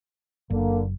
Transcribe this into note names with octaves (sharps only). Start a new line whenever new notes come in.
F#1 D3 A#3